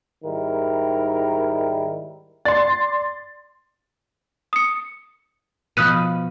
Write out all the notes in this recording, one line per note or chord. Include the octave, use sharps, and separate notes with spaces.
G#2 D#3 G3 E4 A#4
D5 C6 A6
D#6 C#7
B2 F3 B5 D#6 F#6 D#7